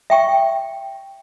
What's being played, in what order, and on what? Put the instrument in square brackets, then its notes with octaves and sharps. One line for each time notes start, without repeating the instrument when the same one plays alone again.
[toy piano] E5 G5 C#6